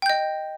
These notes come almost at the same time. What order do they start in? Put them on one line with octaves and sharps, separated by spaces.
G5 G6 D#5